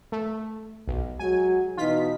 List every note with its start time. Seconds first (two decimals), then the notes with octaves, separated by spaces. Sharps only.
0.12 A3
0.88 B1
1.20 F#3 G#3 F#4 G#5
1.77 B2 E3 D#4 F4 B6